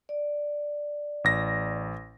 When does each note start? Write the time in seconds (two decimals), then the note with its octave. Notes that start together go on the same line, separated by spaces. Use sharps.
0.09 D5
1.24 A1 A#6